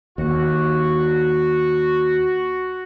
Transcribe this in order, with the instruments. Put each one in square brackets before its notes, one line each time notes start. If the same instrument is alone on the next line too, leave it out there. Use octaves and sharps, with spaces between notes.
[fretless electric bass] D#2 [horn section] F#4